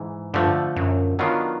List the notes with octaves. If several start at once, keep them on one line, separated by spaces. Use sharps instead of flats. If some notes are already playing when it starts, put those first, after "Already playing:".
Already playing: G#2 E3
G2 D3 F3 A3
F#2
D#3 F#3 B3 D4 F4